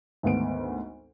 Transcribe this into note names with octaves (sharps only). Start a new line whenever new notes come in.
G#1 D2 B3 D7